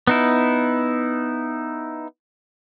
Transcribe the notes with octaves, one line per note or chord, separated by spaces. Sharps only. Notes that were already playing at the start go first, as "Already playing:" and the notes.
B3 D#4 E4